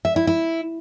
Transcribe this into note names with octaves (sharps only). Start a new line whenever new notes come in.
E5
E4
E4